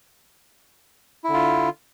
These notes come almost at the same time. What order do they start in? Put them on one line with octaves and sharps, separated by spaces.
E4 D3 F4